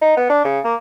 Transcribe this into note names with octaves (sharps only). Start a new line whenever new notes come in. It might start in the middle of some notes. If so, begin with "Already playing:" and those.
D#4
B3
D4
C#3
A#3